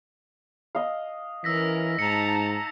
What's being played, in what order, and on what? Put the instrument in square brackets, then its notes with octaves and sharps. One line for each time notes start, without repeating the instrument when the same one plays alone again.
[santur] D#5 F5
[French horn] E3 [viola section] C#4 A#4 [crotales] E6 A#6 B6
[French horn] G#2 [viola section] D#4 A5 A#5 [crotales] C#7